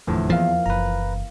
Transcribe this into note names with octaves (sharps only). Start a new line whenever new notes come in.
F1 E2 A2 D3 F3 F#3
E2 C#3 F3 A#3 F5
F#1 E3 B4 A#5